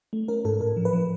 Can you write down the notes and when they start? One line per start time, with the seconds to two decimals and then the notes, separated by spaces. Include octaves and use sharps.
0.13 A3
0.28 C#4 A#4
0.45 G#2 A4
0.61 A2 A#4
0.77 F3
0.85 B4
0.93 F3